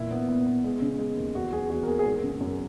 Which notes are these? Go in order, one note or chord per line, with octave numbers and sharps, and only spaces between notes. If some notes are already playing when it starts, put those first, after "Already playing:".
Already playing: E2 A#2 E4
B3
B3
B3
G#3
C#3
G#3
D#2
E2 F#4
F#3 G#4
E2 F#4
A#4
A#3 G#4
G#4
G#1 A#4
C#3
F#2